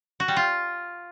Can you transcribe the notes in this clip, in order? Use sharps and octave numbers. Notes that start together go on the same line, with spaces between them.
F#4
G3
F4